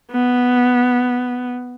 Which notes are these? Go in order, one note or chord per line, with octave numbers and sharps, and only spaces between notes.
B3